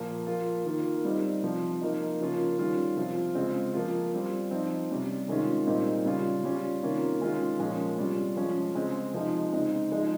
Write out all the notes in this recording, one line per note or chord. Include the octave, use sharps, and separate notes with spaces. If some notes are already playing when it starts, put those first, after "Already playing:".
Already playing: A#2 F3 A#3
F3 A#3 F4
D#3 A#3 F4
G3 C4 D#4
C3 F3 C4
F3 A#3 D#4
C#3 F3 A#3 C#4 F4
D#3 G3 C#4 F4
C3 F3 C4 F4
C#3 G#3 C4 F4
F3 A#3 F4
G3 C4 F4
F3 C4 D#4
C3 G3 C#4
C3 D#3 G#3 C#4 F4
A#2 G3 C4 D#4
C#3 G3 C#4 F4
G3 C#4 F4
C3 D#3 A#3 C#4 F4
D#3 G#3 C#4 F4
A#2 F3 G#3 C#4
C3 G3 C#4 F4
F3 G#3 C#4 F4
C#3 G#3 C4
C3 F3 G#3 D#4
C#3 G#3 C4 D#4
F3 G#3 D#4